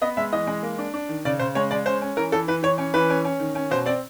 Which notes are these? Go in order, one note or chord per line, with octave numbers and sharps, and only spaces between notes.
B3 D#5
G#3 E5
E3 D#5
G#3
A#3
D4
D4
D#3
C#3 D5
C#3 C5
G#3 C#5
G#3 D5
C#4 C5
C#4
E3 A#4
E3 A4
E3 B4
E3 C#5
C#4
E3 B4
C#4
C#4
D#3
C#4
B2 C5
C4 D5